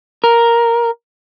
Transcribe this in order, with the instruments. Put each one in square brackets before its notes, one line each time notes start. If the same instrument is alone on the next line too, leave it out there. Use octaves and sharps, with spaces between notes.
[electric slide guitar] A#4